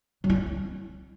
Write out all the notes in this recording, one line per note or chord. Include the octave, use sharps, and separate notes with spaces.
F#3
E4
C4